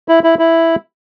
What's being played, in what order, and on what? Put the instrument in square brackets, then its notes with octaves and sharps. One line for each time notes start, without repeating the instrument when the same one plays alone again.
[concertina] E4
E4
E4